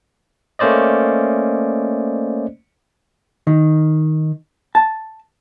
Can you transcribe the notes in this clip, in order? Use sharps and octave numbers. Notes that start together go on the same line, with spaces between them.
A3 A#3 C#4 C5 D5 D#5
D#3
A5